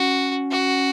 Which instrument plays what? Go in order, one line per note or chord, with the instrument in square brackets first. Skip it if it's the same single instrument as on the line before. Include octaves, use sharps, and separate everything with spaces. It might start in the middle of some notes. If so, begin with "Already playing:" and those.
Already playing: [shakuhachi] C#4 [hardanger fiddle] F#4
[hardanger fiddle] F#4